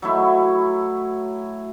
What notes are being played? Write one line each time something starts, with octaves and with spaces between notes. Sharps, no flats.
F#3 A3 E4